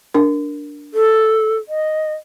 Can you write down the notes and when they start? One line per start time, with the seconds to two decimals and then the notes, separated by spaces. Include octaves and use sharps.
0.14 D4 A#4
0.94 A4
1.68 D#5